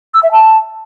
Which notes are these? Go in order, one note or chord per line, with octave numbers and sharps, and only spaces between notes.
E6
E5
A5